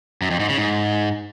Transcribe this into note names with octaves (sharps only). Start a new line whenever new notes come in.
F#2
F2
G#2
C#3
G#2